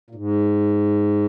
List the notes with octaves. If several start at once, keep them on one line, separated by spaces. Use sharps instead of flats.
A#2
G#2